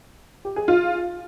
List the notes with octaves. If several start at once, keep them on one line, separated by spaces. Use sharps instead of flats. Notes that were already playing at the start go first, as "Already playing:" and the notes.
G4
G#4
F4